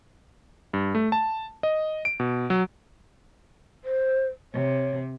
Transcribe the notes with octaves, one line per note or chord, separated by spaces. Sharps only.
G2
A3
A5
D#5
D7
B2
F#3
C5
C3 C#5